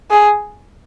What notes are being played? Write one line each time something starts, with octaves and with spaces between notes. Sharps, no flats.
G#4